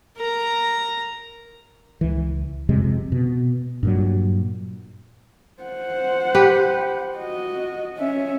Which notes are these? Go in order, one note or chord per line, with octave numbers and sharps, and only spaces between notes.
A#4 A#5
C#2 E3
F2 C3 G#3
B2
G2 A#2 F#3
C5 F#5
G4 B4
F#4 D#5
C#4 E5